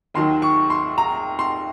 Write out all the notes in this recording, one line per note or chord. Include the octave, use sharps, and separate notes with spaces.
D#2 D#3 F#3 C6
C#6
C6
A#5
C6